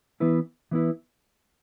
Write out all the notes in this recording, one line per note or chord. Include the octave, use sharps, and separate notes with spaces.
E3 B3 E4 B4
E3 B3 E4 B4